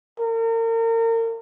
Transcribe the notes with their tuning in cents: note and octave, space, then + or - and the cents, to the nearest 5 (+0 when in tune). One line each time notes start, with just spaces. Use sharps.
A#4 -35